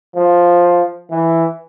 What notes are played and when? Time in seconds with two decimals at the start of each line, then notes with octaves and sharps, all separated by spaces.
0.15 F3
1.10 E3